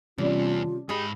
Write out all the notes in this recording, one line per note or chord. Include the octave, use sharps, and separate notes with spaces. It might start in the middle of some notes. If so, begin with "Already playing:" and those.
E2 C3 G3 C#4 D4 F4
G#2 D#4 G4 G#4 B5